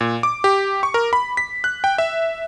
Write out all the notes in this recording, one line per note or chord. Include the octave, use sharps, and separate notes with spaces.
A#2
D6
G4
C#6
A#4
B5
B6
F#6
G5
E5